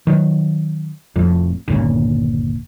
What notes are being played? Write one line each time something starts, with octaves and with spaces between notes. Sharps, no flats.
D#3 F#3
F1 F2 A2
G1 D#2 A#2 C#3